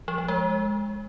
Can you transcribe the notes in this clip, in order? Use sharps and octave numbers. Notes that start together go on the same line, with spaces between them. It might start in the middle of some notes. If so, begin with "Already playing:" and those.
F3
F3
G#3